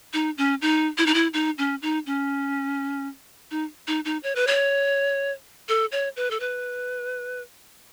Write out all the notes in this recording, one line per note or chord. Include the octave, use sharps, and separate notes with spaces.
D#4
C#4
D#4
E4
D#4
E4
D#4
C#4
D#4
C#4
D#4
D#4
D#4
C#5
B4
C#5
A4
C#5
B4
A4
B4